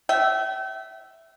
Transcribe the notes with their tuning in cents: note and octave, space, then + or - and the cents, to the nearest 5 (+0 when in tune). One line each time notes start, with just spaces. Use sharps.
E5 +0 G5 -40